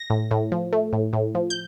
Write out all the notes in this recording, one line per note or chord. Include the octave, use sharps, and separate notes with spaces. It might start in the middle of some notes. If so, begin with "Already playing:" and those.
Already playing: A#6
A2
A2
F3
A3
A2
A2
F3
G6